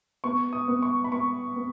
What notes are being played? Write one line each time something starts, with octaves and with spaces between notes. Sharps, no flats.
B3 C#6
D#6
B3
C#6
B5
B3 C#6
B3